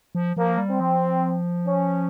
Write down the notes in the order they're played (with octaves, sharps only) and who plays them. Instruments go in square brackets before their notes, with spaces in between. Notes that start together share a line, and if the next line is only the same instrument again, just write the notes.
[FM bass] F3
[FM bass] F3 [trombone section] A#3
[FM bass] G3
[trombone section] C4
[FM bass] F3
[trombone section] C#4